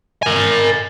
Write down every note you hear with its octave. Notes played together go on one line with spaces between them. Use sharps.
A#4 G#5